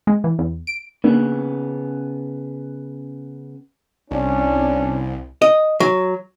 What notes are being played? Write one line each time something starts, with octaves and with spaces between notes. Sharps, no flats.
G#3
E3
E2
D7
C#3 A#3 B3 D4
C2 C#4 D4
D#5
F#3